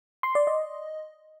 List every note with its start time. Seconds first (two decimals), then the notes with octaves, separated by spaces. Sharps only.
0.23 C6
0.35 D5
0.47 D#5